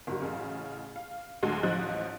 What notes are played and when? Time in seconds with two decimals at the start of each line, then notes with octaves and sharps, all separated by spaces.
0.07 F#1 G2 F#4
0.22 A1 C#3
0.96 F5
1.43 D2 D3 F#3 G#3
1.63 A1 F3 D#4 F#6